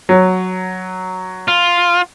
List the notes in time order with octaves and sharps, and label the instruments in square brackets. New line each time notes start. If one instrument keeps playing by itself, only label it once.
[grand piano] F#3
[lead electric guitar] F4